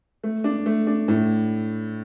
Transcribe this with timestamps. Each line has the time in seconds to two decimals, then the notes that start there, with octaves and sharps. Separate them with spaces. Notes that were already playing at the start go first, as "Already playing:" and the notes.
0.24 A3
0.44 D4
0.66 A3
0.87 D4
1.08 A2